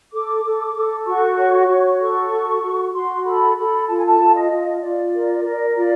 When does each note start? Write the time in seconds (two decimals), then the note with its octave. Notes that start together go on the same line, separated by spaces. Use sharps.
0.12 A4 D6
0.44 A4
0.75 A4
1.06 F#4 C#6
1.38 C#5
1.68 F#4
2.00 A4 C#6
2.32 F#4
2.63 F#4
2.94 F#4 C6
3.25 A4 B5
3.56 A4 B5
3.88 F4 A5
3.97 G#5
4.06 A5
4.20 F4
4.34 D#5
4.50 F4
4.82 F4 D5
5.13 A#4
5.43 A#4
5.75 F4 D5